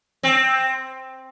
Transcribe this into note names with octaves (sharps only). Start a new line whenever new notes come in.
C4